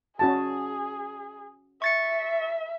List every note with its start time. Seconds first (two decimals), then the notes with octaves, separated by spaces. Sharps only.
0.19 C#4 F#4 G#4 A5
1.82 E5 C#6 A6 C#7